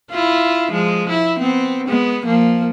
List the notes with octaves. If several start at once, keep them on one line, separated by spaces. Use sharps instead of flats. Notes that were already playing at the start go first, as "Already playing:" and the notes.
E4 F4
F3 G#3
E4
B3 C4
G#3 B3
F3 A#3